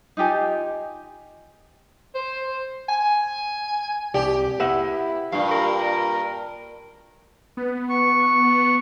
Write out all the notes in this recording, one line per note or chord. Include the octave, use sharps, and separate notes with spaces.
D#4 F4 G4 G#5
C5
G#5
C2 G4 D5
E4 B4 E5 F#5
G2 A#2 F5
A#4
B3
C#6